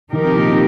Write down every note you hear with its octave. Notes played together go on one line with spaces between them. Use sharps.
D#3 F3 D#4 G4 A#4
C3
A#2
C3